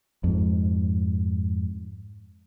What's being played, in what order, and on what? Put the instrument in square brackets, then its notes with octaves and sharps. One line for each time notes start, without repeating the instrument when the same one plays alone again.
[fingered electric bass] F2 G#2